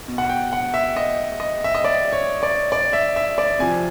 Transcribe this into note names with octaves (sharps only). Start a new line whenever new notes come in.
B2
F#5
G5
F#5
E5
D#5
D#5
E5
D#5
D5
C#5
D5
D5
E5
E5
D5
C3 F3 G#5